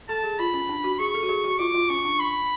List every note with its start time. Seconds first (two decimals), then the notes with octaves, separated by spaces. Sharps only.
0.09 A4 A5
0.24 G#4
0.39 F4 B5
0.54 C#4
0.69 D4
0.84 F#4
0.99 G#4 C#6
1.14 A4
1.23 F#4
1.29 G#4
1.44 F#4
1.59 F4 D6
1.74 F4
1.89 C#4 C#6
2.05 D4
2.20 B5